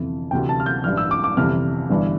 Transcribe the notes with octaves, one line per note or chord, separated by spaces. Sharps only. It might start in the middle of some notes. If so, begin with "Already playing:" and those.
Already playing: G1 F2 C3 E3
D2 C3 E3 G5
A5
F6
G6
A1 G2 E3 F6
E6
D6
D6
G1 F2 C3 E3 F6
G1 G2 E3